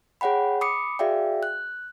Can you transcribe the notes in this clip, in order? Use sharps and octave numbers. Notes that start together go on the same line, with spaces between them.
G#4 C#5 F#5 G5 B5
B5 D6 D#6 C7 C#7
F#4 G#4 D5 E5 F5 G5
F#6